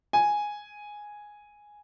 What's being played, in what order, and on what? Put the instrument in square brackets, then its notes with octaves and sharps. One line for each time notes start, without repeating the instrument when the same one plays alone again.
[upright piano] G#5